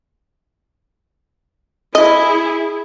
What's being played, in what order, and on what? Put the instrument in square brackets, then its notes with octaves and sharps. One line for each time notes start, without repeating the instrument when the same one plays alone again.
[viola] E4 G#4 [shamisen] D#5